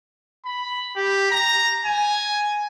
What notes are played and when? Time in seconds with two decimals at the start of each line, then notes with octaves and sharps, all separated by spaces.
0.45 B5
0.96 G4
1.31 A#5
1.85 G#5